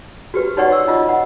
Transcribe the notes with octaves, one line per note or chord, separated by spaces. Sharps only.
F#4 G4 B4
D#4 F#4 C#5 D5 F#5 C#6
E6
D#4 F4 D#5
F#5